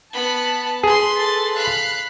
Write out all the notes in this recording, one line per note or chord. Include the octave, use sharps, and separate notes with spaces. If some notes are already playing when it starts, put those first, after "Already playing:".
B3 A5 B5
G#4 B4 C6
A4 A6
F5 B5 F#6